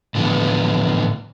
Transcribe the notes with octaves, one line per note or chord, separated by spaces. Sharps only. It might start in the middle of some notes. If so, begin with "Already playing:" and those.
A2 D3 E3 F3 B3